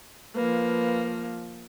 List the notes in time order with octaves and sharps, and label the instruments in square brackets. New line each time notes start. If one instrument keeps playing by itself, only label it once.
[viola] F3 A#3 [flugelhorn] B4